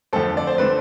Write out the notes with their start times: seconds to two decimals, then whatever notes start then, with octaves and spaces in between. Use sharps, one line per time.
0.13 F2 D3 A3 C4 A4
0.37 D5
0.47 C5
0.58 D3 A3 C4 B4